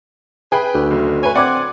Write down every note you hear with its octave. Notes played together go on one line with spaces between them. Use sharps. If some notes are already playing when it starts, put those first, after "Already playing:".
G#4 B4 G5 B5
D2
F#1
B4 C#5 G#5
C4 D5 F#5 D6 G#6